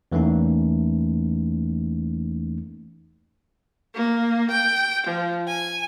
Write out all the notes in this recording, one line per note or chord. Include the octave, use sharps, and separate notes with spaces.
E2 E3 A3 A#3 C#4 D#4
A#3
G5
F3
G#5